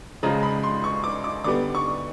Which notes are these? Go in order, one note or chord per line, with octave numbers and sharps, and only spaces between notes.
C#3 F3 G#3 A#5
B5
C6
C#6
D6
D6
D3 G3 B3 D6
C#6